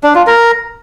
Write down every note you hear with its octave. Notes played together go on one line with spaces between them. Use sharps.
D4
F4
A#4